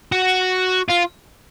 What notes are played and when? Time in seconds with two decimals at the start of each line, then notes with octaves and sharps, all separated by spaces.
0.12 F#4
0.88 F4